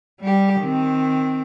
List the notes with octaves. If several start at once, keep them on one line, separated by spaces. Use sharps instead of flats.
G3 G4
D#3 C4